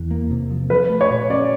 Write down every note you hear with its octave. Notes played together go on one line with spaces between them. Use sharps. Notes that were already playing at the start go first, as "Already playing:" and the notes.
Already playing: E2
A#3
C3
F3
F3 B4
A3
C#5
A#2
C#4 D5